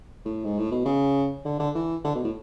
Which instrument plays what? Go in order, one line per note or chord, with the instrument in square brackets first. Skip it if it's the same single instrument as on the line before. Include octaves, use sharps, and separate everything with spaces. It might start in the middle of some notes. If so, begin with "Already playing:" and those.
[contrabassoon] A2
G#2
A2
B2
C#3
D3
D3
E3
D3
B2
A2